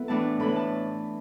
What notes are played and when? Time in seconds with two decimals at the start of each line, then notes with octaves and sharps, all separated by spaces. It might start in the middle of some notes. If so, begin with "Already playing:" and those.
Already playing: B3 E4 A4 B4
0.08 A2 E3 A3 D4 A5
0.40 A2 E3 A3 E4 B5
0.56 A5